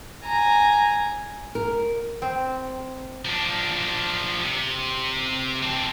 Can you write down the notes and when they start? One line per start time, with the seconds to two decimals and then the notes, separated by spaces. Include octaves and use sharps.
0.24 G#5 A#5
1.55 A#4
2.22 C4
3.25 F3 D4
4.41 C3
5.62 C4 D4